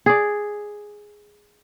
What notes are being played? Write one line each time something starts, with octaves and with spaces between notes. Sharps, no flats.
G#4 D5